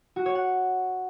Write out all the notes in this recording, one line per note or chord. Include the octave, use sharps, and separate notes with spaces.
F#4
C#5
F#5